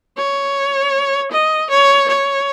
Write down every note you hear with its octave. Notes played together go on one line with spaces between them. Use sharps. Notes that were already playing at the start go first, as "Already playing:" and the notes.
C#5
D#5
C#5
C#5